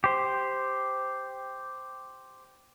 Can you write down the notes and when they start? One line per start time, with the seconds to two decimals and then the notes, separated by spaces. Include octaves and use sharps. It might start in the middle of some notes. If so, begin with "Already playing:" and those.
0.04 G4 C5